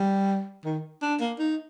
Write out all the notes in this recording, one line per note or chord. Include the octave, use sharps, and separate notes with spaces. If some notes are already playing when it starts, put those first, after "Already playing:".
Already playing: G3
D#3
D4
A#3
D#4